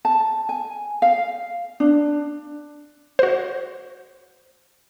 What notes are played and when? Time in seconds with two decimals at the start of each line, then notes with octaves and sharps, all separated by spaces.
0.05 A5
0.49 G#5
1.02 F5
1.80 D4
3.19 F#4 C5